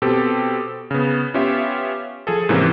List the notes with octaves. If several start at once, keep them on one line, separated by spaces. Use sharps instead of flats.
B2 C4 G4 A4
C#3 B3
B3 C#4 F4 G4 E5
F3 G#4 A4
G#2 C3 E3 F3 A#3 C#4